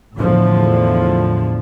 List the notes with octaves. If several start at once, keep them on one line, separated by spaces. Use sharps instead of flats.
E2 A2 D3 F3